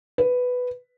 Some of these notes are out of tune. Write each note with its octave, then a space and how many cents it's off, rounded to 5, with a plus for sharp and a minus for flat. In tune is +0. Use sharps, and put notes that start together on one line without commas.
B4 +5